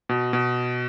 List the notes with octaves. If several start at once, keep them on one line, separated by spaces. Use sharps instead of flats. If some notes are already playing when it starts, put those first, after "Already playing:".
B2
B2